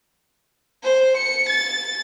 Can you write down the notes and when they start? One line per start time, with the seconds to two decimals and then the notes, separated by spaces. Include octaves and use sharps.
0.83 C5
1.17 C#7
1.49 A6